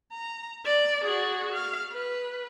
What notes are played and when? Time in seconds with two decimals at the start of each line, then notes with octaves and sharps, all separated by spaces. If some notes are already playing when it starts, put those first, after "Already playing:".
0.12 A#5
0.66 D5
1.04 F#4 G#4
1.53 F5
1.92 B4